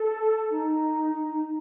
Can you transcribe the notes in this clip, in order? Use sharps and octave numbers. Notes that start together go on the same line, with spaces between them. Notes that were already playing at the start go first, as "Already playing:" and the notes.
Already playing: A4
D#4